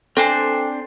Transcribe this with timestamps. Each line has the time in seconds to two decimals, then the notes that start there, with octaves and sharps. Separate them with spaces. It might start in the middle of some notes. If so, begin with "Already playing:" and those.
0.17 C4 D4 A4 C5 G5 G#5